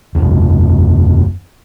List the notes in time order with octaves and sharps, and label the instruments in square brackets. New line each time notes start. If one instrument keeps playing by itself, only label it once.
[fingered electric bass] F#1 E2